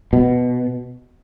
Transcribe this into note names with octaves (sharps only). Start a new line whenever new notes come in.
B2